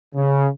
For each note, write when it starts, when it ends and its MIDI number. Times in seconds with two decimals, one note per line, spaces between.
0.15 0.48 49